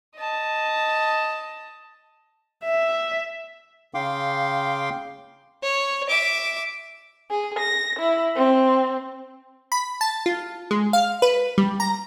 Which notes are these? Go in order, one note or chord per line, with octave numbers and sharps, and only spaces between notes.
D#5 A5
E5
C#3 F5 G5 C6 D6
C#5
E5 D6
G#4
A#6
E4
C4
B5
A5
F4
G#3
F5
B4
G3
A#5